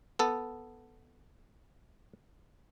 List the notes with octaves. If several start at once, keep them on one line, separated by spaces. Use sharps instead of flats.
B3 A4